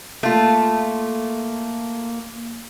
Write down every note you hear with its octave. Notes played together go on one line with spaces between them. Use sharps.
A3 A#3 F4